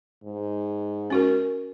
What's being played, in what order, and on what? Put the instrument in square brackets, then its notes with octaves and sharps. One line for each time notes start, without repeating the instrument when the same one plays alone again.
[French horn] G#2
[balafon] C#4 F#4 A#4